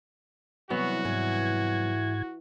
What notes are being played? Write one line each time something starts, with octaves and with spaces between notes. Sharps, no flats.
C2 E3 F#3 B3 F#4 C#6
G#2 E3 G#6